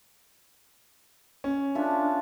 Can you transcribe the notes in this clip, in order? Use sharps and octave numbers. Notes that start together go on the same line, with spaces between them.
C#4
D4 F4 A4 E5